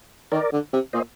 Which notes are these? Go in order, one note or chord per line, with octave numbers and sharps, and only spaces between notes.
D#3 A#4 D5
D3
C3
A#2 C5 D#5